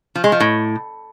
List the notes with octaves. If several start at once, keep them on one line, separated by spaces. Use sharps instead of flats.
F3
G#3
F3
A2